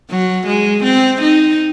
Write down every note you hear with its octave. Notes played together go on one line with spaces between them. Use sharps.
F#3
G#3
C4
D#4